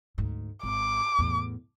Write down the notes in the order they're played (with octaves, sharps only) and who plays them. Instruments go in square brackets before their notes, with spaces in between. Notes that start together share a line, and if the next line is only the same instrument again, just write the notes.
[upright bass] D2 G#2
[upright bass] G#1 [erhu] D6
[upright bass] E2 A2